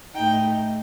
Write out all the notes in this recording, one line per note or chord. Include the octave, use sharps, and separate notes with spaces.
A2 A3 D#4 G5